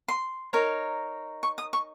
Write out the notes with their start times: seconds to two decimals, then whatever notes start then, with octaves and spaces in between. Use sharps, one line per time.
0.08 C6
0.53 D#4 A#4 C#5
1.43 C#6
1.58 D#6
1.73 C#6